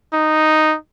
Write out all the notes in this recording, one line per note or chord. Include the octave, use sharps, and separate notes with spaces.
D#4